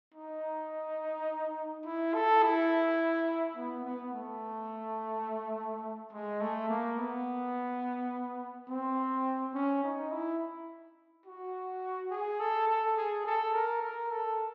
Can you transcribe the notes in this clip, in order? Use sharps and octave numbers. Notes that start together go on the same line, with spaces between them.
D#4
E4
A4
E4
B3
B3
A3
G#3
A3
A#3
B3
C4
C#4
D#4
E4
F#4
G#4
A4
A4
G#4
A4
A#4
A#4
A4